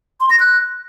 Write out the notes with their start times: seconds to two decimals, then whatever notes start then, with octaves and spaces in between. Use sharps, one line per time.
0.20 C6
0.30 A#6
0.40 F#6